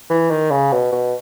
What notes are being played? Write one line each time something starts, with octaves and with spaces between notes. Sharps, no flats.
E3
D#3
C#3
B2
B2